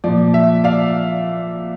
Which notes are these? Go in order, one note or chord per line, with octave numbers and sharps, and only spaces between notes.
A#2 F3 D5
E5
D5 F5